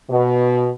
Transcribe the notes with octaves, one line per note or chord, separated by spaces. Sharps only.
B2